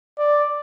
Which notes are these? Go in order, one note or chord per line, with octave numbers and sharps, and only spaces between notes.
D5